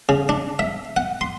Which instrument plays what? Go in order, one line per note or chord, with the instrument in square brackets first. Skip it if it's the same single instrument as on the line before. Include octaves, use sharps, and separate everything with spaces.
[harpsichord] C#3
D4
E5
F#5
C6